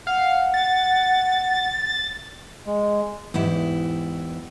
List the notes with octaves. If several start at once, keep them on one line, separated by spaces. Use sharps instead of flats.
F5 F#5
A6
G#3
E2 G#2 E4 G4